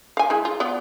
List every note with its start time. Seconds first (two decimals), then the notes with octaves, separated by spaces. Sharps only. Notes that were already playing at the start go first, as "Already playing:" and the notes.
0.17 F5 G#5
0.30 G#3 E4
0.45 F4
0.60 B3 F4 D5